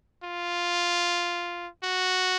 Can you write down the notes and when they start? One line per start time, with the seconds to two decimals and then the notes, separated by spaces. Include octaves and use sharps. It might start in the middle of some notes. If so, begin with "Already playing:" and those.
0.24 F4
1.84 F#4